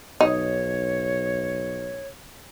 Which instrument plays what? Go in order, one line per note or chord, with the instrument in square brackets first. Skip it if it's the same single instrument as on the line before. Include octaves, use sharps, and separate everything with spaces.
[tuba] B1 [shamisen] D#4 [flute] C#5